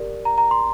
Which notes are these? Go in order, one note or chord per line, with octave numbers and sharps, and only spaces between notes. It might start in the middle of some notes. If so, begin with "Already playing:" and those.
Already playing: G4 A#4 D5
A#5
A#5
C6